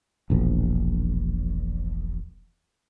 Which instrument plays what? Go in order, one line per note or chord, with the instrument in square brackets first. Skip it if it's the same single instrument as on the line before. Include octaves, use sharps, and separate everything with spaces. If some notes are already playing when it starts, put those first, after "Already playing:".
[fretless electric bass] E1 A#1